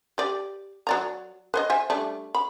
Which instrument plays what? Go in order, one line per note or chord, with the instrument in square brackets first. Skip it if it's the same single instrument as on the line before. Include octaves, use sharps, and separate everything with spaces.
[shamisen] G4 D5
F#3 D5 A#5
B4 C5 D#5
C5 E5 G#5
G3 A3 D4
B5